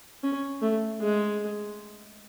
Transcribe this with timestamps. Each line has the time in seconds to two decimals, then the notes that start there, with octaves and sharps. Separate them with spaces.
0.23 C#4
0.62 A3
1.01 G#3